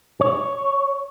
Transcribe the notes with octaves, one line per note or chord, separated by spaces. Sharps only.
C#5